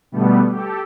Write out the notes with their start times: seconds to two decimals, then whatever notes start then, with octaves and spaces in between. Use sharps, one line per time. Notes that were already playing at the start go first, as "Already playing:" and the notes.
0.12 B2 D3 G3 A3 B3
0.52 G4 A4